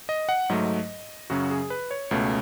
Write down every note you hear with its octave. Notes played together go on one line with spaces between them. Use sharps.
D#5
F#5
G#2 F#3 A3 D#5
F#2 C#3 F#3 C#4 F#4
G#4
B4
C#5
C#2 B2 A3 C#4